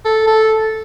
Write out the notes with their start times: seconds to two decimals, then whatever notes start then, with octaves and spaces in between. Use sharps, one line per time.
0.05 A4
0.27 A4